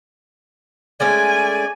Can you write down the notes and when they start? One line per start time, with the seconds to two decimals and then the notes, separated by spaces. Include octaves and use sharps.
1.00 G#3 A3 C#4 D5 G#5